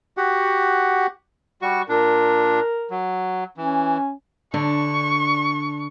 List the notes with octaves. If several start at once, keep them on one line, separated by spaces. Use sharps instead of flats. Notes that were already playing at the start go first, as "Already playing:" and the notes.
F#4 G4 F#5
G3 F#4 C#6
A#2 D4 A#4
F#3
E3 C#4
D3 D4 C#6